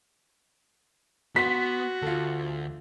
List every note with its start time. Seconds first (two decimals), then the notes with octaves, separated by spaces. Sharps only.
1.36 B3 F#4 C6 B6
2.02 D2 F4 A4